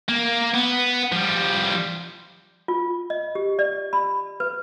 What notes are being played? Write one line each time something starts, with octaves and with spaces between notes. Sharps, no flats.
A#3
B3
F3 G3
F4
D#5
G4
D5
B5
B4